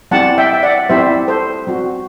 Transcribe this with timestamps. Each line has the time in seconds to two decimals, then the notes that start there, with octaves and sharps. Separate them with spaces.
0.11 G3 C4 E4 G4 F#5 A5
0.38 E5 G5
0.53 E5
0.63 D5 F#5
0.89 G3 C4 E4 G4 C5 E5
1.28 A4 C5
1.67 G3 C4 F#4